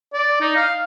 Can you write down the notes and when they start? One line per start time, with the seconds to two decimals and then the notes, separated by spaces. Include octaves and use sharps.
0.13 D5
0.40 D#4
0.56 F5